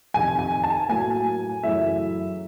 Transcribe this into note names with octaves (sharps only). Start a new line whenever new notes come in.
F2 C3 D#3 G#5
G#5
A5
A2 F#3 A#3 G#5
F#2 C#3 E3 A3 E5